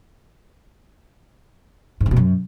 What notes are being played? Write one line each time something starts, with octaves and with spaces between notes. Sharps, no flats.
G#2
D3
B2
F#2